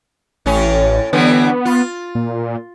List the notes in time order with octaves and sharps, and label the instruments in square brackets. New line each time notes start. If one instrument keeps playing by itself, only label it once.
[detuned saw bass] A1 [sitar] A2 C#4
[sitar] D3 E3 G3 [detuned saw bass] B3
[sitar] F4
[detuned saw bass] A#2